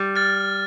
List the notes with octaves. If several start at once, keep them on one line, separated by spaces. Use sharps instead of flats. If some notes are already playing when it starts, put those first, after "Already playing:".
Already playing: G3
F6 A6